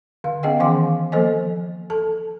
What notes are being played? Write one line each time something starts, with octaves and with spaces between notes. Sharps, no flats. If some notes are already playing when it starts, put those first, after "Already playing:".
D3 F5
B3 C#4 G#4 D#5 F#5 G5
D#3 E3 F5 G#5 C6 D6
F3 A#3 A4 C5 D#5 G#5
A4 A5